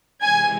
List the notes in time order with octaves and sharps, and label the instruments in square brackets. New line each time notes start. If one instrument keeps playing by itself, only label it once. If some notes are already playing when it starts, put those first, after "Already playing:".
[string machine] C3 E3 G#3 [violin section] G#5 G#6